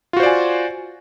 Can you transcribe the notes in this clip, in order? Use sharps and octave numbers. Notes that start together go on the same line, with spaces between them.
F4 F#4 C5 D5 G#5